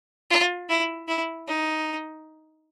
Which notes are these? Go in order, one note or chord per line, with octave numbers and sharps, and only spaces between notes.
F4
E4
E4
D#4